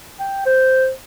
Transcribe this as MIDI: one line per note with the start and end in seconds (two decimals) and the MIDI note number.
0.20 0.44 79
0.46 0.89 72